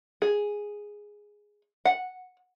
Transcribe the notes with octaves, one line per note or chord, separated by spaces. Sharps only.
G#4
F#5